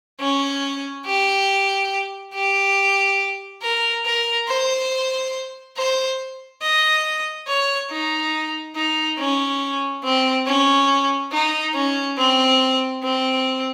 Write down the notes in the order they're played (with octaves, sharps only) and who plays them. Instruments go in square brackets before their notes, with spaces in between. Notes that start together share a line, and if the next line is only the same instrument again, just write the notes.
[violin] C#4
G4
G4
A#4
A#4
C5
C5
D#5
C#5
D#4
D#4
C#4
C4
C#4
D#4
C#4
C4
C4